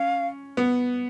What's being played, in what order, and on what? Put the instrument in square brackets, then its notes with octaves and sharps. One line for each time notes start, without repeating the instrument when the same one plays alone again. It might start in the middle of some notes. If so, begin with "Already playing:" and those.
Already playing: [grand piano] C#4 [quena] F5
[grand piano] B3